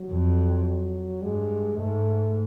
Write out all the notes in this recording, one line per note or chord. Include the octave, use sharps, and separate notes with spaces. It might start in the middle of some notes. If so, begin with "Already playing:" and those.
Already playing: F#3
F2
G2 G#3
G#2 A3